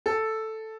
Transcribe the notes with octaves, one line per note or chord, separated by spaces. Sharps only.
A4